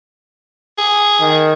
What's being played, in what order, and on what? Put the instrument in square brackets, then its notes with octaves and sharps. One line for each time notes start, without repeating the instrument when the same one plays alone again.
[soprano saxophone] G#4
[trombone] D#3